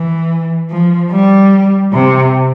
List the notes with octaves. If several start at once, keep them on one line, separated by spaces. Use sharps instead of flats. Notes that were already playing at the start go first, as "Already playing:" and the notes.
Already playing: E3
F3
G3
C3